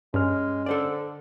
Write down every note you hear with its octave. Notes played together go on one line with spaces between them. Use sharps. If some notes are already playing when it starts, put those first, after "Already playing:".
G2 G#3 C#4 F6
D3 A4 C5 D5